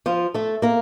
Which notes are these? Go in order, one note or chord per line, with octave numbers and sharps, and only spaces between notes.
F3 F4
A3 A4
A#3 A#4